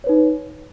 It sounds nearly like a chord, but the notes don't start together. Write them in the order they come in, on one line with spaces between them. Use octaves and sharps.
C#5 B4 D#4